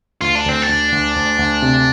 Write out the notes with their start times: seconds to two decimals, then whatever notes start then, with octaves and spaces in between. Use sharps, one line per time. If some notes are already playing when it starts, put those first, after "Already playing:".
0.21 D2 F4
0.35 D4
0.46 D2 C4
0.62 D4
0.69 D2
0.92 D2
1.16 D2
1.39 D2
1.62 C3